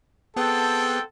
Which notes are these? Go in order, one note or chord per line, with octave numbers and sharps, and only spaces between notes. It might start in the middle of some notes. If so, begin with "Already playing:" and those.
B3 C4 G#4 A4 B4 F#5 G5 A5